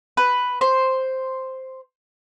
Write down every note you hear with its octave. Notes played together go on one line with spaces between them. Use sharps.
B4
C5